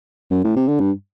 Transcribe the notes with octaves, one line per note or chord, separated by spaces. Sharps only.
F#2
A2
C3
D3
G2